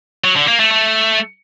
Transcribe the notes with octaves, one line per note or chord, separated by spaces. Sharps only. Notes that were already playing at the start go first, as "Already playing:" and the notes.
F#3
D3
A#3
A3
A3